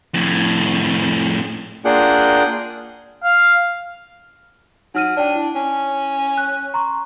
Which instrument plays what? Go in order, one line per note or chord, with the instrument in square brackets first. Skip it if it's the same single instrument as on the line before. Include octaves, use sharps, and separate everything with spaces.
[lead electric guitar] F2 A2
[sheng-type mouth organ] A#3 D4 F4 G#4 F#5 G5
[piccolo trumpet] F5
[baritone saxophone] F#3 [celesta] D#4 F6 D#7
[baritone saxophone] D4 [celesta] D5 G5
[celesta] E4
[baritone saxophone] C#4
[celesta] F#6
A#5 C6 C#6